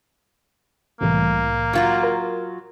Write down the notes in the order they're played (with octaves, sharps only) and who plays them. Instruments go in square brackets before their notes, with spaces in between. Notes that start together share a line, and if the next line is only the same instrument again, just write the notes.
[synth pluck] C2 A2 E3 [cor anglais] A#3
[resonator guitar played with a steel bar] F#3 F4 F#4
[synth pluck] A#4